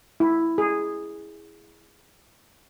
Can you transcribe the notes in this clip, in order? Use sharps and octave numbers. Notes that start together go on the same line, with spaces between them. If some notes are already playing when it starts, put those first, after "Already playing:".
E4
G#4